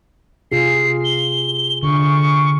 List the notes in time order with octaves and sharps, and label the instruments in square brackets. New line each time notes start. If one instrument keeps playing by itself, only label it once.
[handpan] C3 F4 G#4 [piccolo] C7
[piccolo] G7
[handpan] D3 [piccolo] C#6